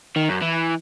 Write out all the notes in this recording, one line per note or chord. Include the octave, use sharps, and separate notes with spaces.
D#3
F#2
E3